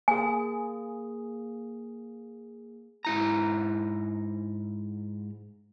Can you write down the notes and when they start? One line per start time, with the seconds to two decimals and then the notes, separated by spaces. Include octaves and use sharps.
0.08 A#3 G#4 G#5
3.05 G#2 E4 A#5